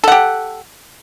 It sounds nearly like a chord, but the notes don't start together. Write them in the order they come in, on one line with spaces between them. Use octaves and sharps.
A4 F#5 G4